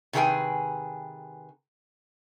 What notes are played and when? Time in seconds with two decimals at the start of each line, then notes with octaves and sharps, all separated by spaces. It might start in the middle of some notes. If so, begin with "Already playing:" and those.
0.13 C3 D#3 G#4 B4 G5 G#5